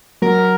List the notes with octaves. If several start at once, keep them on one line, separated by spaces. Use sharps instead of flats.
F#3 A#4